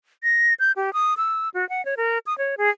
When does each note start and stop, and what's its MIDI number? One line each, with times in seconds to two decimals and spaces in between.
0.23 0.54 94
0.60 0.72 91
0.76 0.93 67
0.93 1.14 87
1.17 1.49 88
1.54 1.68 66
1.69 1.84 78
1.85 1.95 73
1.97 2.18 70
2.26 2.36 87
2.38 2.55 73
2.58 2.70 68